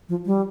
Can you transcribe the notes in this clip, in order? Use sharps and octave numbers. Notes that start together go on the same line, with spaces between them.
F3
G3